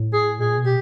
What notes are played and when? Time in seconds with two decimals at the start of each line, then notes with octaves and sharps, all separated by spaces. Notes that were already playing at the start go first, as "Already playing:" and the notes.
Already playing: A2
0.13 G#4
0.39 A#2 G#4
0.57 B2
0.66 G4